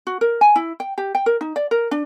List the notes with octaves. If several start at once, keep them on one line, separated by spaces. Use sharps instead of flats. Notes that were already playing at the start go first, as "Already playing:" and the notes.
F#4
A#4
G#5
E4
G5
G4
G5
A#4
D#4
D5
A#4
D4